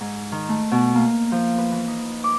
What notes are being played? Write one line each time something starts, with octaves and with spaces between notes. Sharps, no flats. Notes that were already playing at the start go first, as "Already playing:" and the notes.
G#2
D#3
A3
B2
A#3
F3
B4
E3
D#4
D6